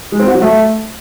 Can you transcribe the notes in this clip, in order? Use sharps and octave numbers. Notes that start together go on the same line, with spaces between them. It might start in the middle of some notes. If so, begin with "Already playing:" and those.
G#3
C4
F#4
F#3
A3